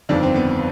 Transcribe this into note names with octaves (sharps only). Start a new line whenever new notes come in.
G1 F2 D3 D#3 D4
C4
B3